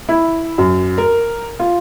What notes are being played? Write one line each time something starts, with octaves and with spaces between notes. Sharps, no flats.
E4
F#2
A#4
F4